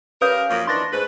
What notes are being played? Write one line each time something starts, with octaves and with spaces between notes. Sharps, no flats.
G3 C#4 A#4 B4 F5 D#6 G6
F#2 F3 A#3
D#3 E3 D4 C6 C#6 A6 A#6
G#2 A3 B4